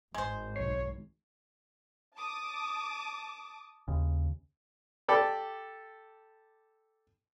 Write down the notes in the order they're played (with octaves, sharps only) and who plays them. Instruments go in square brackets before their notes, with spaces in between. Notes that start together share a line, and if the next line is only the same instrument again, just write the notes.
[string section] G#1 [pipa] G#3 C5
[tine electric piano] B1 C7 [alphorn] C#5
[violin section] A5 D6 D#6
[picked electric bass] D#2 C#3
[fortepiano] G4 A4 D5 B5